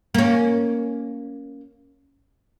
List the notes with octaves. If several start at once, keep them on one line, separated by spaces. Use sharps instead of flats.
A#3 C#4